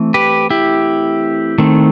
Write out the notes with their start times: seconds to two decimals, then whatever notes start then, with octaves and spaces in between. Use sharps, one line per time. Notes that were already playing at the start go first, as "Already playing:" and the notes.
Already playing: E3 A3 C4
0.14 G4 B4
0.50 E4 G4
1.58 D#3 A3 C4